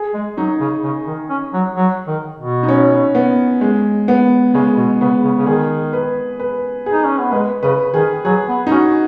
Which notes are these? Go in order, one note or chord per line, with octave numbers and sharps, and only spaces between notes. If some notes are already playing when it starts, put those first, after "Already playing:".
Already playing: G#4
G#3
F#3 D#4
C#3
C#3
D#3
C#4
F#3
F#3
D#3
B2
D#4
C#4
B3
G#3
B3
C#3 G#3
B2
C#3 B3
C#3
C#3
D#3 G#4
B4
B4
G#4
D#4
C#4
B3
G#3 B4
C#3 B4
D#3 G#4
F#3 G#4
B3
D#4
C#4 F#4